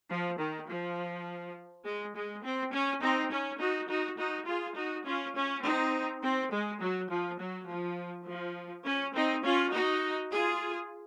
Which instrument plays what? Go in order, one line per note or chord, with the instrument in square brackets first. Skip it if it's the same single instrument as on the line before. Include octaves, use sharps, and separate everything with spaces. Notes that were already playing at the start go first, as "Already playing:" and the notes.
[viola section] F3
D#3
F3
G#3
G#3
C4
C#4
C4 D#4
C#4
D#4 F#4
D#4 F#4
D#4 F#4
F4 G#4
D#4 F#4
C#4 F4
C#4
C4 D#4
C4
G#3
F#3
F3
F#3
F3
F3
C#4
C4 D#4
C#4 F4
D#4 F#4
F4 G#4